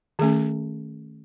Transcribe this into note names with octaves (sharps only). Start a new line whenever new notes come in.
D#3 A3 C#4 G#4